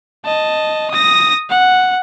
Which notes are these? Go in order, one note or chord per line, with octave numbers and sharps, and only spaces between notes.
D#5 A5
D#6 A#6
F#5